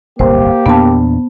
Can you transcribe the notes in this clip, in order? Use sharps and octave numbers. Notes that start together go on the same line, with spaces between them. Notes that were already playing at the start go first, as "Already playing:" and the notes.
D1 G1 C2 A#3 G4 C5
E2 A#2 B3 D4 A5